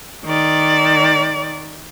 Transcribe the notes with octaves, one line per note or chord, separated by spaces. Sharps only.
D#3 D5